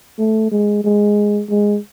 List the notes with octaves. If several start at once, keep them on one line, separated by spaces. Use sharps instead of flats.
A3
G#3
G#3
G#3